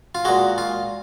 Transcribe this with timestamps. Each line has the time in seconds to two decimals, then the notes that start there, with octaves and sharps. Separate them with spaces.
0.15 F4
0.25 A#2 G#3 F#4
0.58 F4